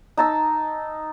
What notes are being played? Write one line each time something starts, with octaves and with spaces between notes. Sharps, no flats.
D#4 A5 E6